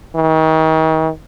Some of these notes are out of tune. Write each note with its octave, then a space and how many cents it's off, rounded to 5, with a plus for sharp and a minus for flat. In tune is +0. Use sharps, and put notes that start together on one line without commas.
D#3 +35